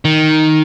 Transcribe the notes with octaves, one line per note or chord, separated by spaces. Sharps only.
D#3